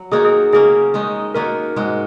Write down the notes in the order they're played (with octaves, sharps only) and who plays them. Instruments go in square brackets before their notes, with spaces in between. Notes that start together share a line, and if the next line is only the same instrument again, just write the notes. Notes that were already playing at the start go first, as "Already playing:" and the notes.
Already playing: [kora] F#3
[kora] D#3 A#3 D#4 F#4 [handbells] G#4
[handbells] G#4
[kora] C#3 A#3 C#4 [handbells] G#4
[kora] D#3 G#3 D#4
[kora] D#3 A#3 F#4 [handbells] A#4
[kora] G#2 G#3 F#4